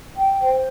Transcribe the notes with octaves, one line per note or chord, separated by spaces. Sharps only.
G5
C5